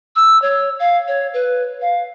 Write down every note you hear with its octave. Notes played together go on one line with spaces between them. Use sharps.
E6
C#5
F5
C#5
B4
F5